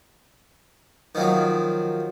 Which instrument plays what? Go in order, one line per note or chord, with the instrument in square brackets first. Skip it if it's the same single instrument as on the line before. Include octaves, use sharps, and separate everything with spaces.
[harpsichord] D#3 F3 F#3